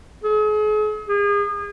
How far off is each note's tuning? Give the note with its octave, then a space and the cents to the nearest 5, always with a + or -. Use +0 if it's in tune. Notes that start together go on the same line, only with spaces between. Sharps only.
G#4 +40
G#4 -35